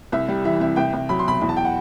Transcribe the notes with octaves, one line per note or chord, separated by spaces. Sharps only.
C2 E5
G3
E3 E5
C3 E5
C2 G5
C2
F#3 B5
C6
B2 B5
E2 B5
A5
G5
F#5